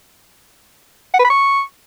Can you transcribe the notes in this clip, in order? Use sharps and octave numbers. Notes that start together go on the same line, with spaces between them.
F#5
B4
B5
C#6